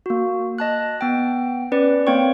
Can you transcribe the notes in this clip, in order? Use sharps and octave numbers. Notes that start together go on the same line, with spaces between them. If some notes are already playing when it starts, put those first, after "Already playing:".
A#3 F#4
D#5 A5 F#6
B3 G5
C#4 B4 D5
A#3 C4 C#5 G5 C#6